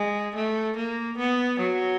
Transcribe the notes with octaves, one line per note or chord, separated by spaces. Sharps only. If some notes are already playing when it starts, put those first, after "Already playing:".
Already playing: G#3
A3
A#3
B3
F#3